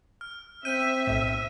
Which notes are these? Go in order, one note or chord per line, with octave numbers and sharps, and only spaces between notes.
F6
C4 E5 G6 D#7
B1 A2